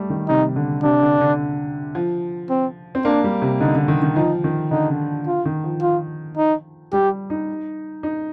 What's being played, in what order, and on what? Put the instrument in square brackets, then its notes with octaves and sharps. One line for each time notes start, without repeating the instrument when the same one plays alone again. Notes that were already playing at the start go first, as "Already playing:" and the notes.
Already playing: [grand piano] G3 A3
D#3
[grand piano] C3 [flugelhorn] D#4
[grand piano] D3
[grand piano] C3 [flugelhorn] D4
[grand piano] D3
D3
F3
[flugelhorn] C4
[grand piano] C4
[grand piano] A#3 [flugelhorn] D4
[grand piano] G3
C3
[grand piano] D3 [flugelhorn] D#4
[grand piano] D3
D#3
D#3
[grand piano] F3 [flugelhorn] D#4
[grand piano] D#3
[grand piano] D3 [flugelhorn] D#4
[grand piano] D3
[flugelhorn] F4
[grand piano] D#3
F3
[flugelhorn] F4
D#4
[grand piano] G3 [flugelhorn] G4
[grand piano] D#4
D#4